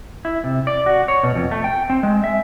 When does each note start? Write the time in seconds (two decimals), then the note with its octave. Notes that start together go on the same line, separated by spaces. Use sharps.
0.25 E4
0.44 C3
0.67 D5
0.86 F#4
1.08 C#5
1.23 B2
1.35 F2
1.51 A3
1.64 G5
1.90 C4
2.03 G#3
2.24 E5